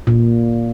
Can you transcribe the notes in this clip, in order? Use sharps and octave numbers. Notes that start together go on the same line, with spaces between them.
A#2